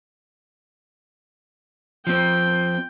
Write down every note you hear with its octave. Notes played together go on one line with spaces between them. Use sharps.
F3 C4 G5